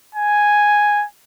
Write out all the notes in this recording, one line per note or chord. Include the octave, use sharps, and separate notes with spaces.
G#5